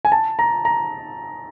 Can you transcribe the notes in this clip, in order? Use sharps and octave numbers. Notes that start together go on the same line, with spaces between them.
G#5
A5
A#5
A#5